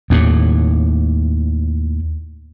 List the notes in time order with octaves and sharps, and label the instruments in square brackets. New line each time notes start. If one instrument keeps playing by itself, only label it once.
[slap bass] D#2 A2